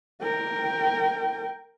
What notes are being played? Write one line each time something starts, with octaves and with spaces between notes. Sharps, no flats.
A#4 G5